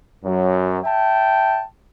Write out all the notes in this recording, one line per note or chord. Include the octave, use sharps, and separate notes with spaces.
F#2 F#3
E5 G5 A5